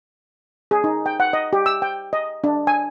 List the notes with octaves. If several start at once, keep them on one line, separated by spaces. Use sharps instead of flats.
G#4
D#4
G5
F#5
D#5
G4
E6
G5
D#5
D4
G#5